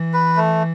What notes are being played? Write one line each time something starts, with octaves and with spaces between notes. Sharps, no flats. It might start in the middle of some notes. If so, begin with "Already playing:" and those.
Already playing: E3
B4
A3